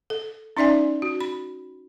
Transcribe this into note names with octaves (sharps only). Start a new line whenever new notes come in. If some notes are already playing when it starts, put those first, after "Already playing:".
A4
C#4 D#4 D5 E5 G#5
F#4
B5